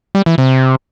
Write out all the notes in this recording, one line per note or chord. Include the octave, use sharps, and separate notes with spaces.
G3
E3
C3